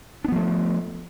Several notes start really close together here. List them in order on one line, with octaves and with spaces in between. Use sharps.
D4 B3 F3 A3